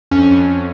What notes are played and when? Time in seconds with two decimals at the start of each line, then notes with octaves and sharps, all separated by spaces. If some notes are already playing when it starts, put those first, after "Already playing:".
0.11 F2 C#4
0.30 F2